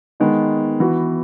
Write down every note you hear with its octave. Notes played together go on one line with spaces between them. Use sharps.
D#3 G#3 B3 D#4
E3 B3 F#4